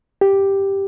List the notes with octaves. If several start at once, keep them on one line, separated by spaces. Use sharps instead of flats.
G4